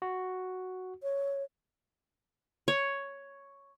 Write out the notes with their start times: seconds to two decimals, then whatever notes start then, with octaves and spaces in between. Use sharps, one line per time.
0.02 F#4
1.03 C#5
2.68 C#5